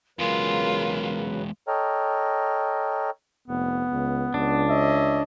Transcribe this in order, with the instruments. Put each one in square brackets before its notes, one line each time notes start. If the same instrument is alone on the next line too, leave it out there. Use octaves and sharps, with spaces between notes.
[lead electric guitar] E2 G#3 [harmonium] C#3 F#3 B4 [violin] F4 [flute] A#4
[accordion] A4 C#5 D#5 G5 A#5 F6
[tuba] F1 [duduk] B3
[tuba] C#2
[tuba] C#2 [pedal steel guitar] D4
[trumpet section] C#5 D#5 E5